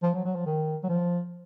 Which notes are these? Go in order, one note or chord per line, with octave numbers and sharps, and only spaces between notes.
F3
F#3
F#3
F3
D#3
F#3
F3